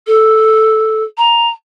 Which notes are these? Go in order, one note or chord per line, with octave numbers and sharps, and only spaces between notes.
A4
A#5